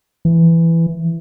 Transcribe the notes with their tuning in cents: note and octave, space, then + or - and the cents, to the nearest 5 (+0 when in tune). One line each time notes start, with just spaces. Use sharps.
E3 +10